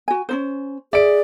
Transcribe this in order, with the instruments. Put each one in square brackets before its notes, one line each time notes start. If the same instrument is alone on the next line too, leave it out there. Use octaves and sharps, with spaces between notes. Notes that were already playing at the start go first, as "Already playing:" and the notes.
[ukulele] F#4 G#5
C#4 D#4 C5
[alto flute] G#4 [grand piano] D5 D7 [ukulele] E5